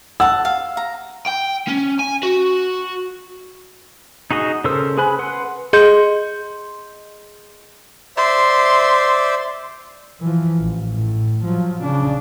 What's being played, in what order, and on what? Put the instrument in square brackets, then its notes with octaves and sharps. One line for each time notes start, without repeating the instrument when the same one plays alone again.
[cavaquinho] F#5 A5 [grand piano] E6
[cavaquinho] F5
A#5
[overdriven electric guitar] G5
C#4
G#5
F#4
[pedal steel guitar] D#4 F#4 G#4 D#5
C#3 A4 A#4 C5 E6
G#4 B4 G#5 B5 F#6
B4 F#5 C6
[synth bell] G#4 D#5 C6 G6
[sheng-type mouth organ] C5 D5 E5 [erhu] C6
[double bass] E3 F3
A1
A2
F3 F#3
C#3 D4